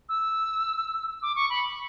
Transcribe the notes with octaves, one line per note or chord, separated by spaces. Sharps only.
E6
D6
C#6
B5